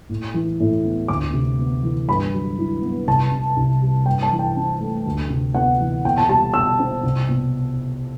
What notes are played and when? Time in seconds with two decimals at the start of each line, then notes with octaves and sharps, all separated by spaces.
0.09 A2
0.34 E3
0.60 A2
0.85 B3
1.08 D2 D6
1.33 C3
1.59 B3
1.83 E3
2.08 G2 B5
2.34 F#3
2.58 E4
2.82 B3
3.07 C2 A5
3.32 C3
3.57 C2
3.82 G3
4.06 G2 G5
4.23 A5
4.31 E3
4.39 G5
4.57 C4
4.80 A3
5.06 D2
5.30 C3
5.54 B3 F#5
5.80 E3
6.05 B2 G5
6.18 A5
6.29 G3 A5
6.54 B2 E6
6.79 C4
7.03 C2
7.28 B2